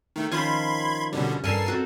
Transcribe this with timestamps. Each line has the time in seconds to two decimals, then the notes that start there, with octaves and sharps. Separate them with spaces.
0.16 D#3 A3
0.32 D#3 F3 C#4 B5 C6 G#6
1.13 B2 D3 G3 C#4
1.44 G2 A4 A#4 G#5 A5 C7
1.66 C4 F#4 A4